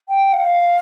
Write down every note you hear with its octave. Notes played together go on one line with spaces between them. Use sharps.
G5
F5